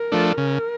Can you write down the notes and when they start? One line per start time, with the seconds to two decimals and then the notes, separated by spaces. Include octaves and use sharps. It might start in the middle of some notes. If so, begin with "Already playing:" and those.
Already playing: A#4
0.12 F3 A3 D4
0.37 C#3 A#4